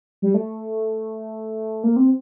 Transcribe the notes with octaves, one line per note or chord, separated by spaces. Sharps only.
G3
A3
A#3
C4